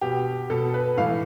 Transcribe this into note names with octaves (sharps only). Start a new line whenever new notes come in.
B2 G4
B2 A4
B4
A2 E3 F5